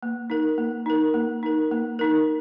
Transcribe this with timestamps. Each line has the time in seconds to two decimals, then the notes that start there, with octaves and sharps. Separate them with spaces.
0.03 A#3
0.30 D#4 A#4
0.58 A#3
0.86 D#4 A#4
1.14 A#3
1.43 D#4 A#4
1.71 A#3
1.99 D#4 A#4